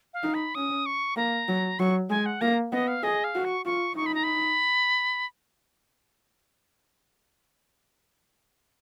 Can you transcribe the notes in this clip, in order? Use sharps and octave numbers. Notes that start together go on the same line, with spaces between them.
F5
D#4
B5
C#4 D#6
C#6
A#3 A#5
F#3
F#3 C#6
G#3 G#5
F#5
A#3 A#5
B3 D#5
F5
G#4 D#5
F5
F#4
C#6
F4 C#6
D#4 C#6
B5
A#5
B5